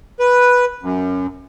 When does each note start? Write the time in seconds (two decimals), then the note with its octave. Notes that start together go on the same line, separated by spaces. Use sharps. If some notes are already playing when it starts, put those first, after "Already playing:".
0.20 B4
0.82 F#2